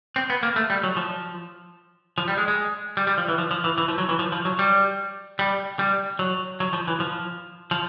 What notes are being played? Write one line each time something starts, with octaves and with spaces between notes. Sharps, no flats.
C4
B3
A#3
A3
G3
F#3
F3
F3
G3
G#3
G#3
G3
G3
F3
E3
F3
F3
E3
E3
F3
F#3
E3
F3
F3
F#3
G3
G3
G3
F#3
F#3
F3
E3
F3
F3